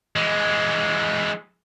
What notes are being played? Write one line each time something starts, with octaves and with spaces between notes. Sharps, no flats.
E3 G#3